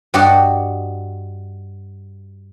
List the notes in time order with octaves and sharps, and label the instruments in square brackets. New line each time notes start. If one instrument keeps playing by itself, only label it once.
[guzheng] G2 F#4 G4 D5 D#5 F#5